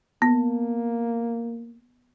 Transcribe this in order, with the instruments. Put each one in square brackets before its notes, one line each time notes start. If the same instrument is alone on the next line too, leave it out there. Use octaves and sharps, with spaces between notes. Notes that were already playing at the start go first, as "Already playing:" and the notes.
[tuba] A#3 [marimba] B3